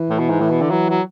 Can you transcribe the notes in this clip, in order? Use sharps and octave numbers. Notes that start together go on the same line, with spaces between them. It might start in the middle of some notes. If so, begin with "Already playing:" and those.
Already playing: E3
A2
B2
G#2
A2 E3
B2
D3
E3 F#3
F#3